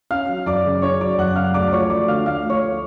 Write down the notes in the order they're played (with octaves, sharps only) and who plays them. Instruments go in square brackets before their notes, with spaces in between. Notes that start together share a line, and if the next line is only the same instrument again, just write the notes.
[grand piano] C#4 F5 F6
F#3
F#2 D5 D6
C#3
C#4 C#5 C#6
F#3 D5 D6
F#2 F#5 F#6
C#3 F5 F6
D2 D5 D6
F3 C#5 C#6
D2 D5 D6
D3 F5 F6
D2 F5 F6
F3
C#5 C#6